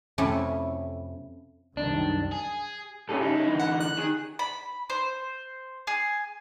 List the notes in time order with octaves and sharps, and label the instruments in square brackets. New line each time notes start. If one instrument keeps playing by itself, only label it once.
[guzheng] F2 C3 A3 C#4 E4
[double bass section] C2 F#2 D#3 [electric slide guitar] D4
[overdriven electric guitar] G#4
[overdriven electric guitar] G2 [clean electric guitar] C#4 G#4 A4
[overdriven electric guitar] C#3 E4 [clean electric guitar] D#4
[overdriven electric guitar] D3 E3
[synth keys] F#5
F#6
[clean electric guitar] D#3 [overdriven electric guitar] G#4
[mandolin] B5
C5
G#4